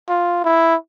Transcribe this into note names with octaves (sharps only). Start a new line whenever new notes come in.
F4
E4